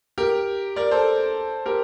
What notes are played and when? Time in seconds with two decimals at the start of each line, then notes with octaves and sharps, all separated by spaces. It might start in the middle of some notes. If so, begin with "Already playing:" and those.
0.18 G4 A#4
0.76 A#4 D5
0.91 A4 C5
1.66 G4 A#4